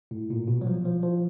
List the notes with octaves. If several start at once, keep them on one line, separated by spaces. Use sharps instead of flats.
A2
A#2
B2
F#3
F3
F3
F3